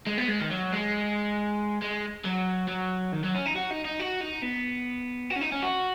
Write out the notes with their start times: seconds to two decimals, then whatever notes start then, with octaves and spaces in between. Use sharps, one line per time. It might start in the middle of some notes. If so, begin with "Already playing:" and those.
0.07 G#3
0.18 B3
0.28 G#3
0.40 D#3
0.51 F#3
0.73 G#3
1.82 G#3
2.25 F#3
2.68 F#3
3.13 D#3
3.24 F#3
3.34 C#4
3.46 D#4
3.55 F#4
3.70 D#4
3.85 D#4
4.00 F#4
4.21 D#4
4.42 B3
5.30 F#4
5.36 C#4
5.41 D#4
5.52 C#4
5.63 F#4